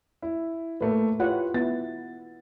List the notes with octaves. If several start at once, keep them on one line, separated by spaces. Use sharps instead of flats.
E4
A2 A3 A#3 B4
E4 F4 G4 B4 C#5 F#5
B3 E4 A6